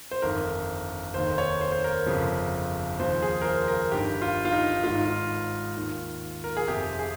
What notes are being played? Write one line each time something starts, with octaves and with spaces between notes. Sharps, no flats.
C5
G1 F2 D#3 A#4
F1 D#2 D#3 C5
C#5
C5
C5
A#4
G1 F2 C#3 F3
D#2 C#3 F3 C5
G#4
A#4
C5
A#4
G1 G2 D#3 G4
F4
F4
D#4
G#1 G#2 D#3 F4
D#4
F4
D#2 D#3
A#4
G#4
G1 F2 C3 G4
G#4